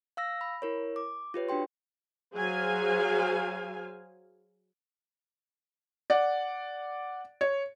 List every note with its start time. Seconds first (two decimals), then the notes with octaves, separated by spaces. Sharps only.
0.17 F5 E6 A#6
0.41 B5
0.62 E4 A#4 C#5
0.96 D6
1.34 F4 G4 B4 C#5
1.49 D4 F#4 G4 G5 C6
2.35 F#3 G#4 C5 F5 G#5
6.10 D5 F#5
7.41 C#5